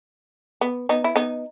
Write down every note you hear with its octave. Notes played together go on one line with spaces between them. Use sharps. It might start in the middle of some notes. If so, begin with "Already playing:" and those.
B3
B3 D#4
E4
B3 D#4